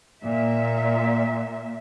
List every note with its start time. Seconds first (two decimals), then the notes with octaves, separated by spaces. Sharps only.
0.22 A#2 E5